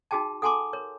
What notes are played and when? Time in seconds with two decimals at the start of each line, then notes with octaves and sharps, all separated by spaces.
0.11 D#4 F#4 G#4 G5 A5
0.42 A4 F#5 G#5 A5 C6 D6
0.73 A#4 C#5